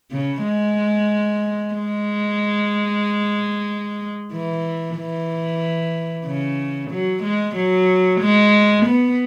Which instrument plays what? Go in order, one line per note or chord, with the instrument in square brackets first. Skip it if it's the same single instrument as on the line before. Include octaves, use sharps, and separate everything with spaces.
[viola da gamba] C#3
G#3
G#3
E3
E3
C#3
F#3
G#3
F#3
G#3
B3